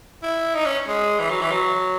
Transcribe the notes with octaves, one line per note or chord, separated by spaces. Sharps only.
E4
D#4
C#4
G#3
E3
F#3
E3
F#3